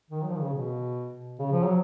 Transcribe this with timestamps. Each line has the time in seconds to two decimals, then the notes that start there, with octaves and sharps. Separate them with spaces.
0.10 D#3
0.23 F#3
0.28 F3
0.36 D#3
0.41 C#3
0.54 B2
1.39 C#3
1.52 F3
1.64 F#3